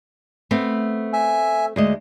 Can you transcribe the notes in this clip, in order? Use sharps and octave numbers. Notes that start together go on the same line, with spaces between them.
A3 B3 C4
E5 G#5
D2 G#3 D#5